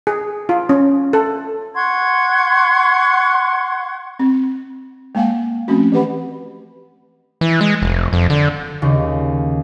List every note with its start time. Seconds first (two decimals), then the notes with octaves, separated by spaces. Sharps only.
0.07 G#4
0.49 F4
0.69 C#4
1.13 A4
1.75 F#5 C6 C#6 G#6
4.19 C4
5.15 G#3 A#3 F5 F#5 G#5
5.68 F3 A3 C4 C#4 F#4
5.92 E3 G4 B4 F#5 B5
7.41 E3
7.61 G#3
7.82 F1
8.13 F2
8.30 D3
8.82 D#2 C#3